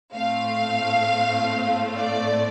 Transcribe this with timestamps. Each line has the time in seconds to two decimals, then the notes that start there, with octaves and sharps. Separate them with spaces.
0.14 A2 A3 C4 F5
1.96 D5